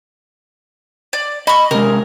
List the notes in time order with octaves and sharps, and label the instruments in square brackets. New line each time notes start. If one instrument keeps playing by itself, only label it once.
[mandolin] D5
[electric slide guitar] D#5 [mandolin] B5 C#6
[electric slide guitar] C3 G#3 [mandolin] A#4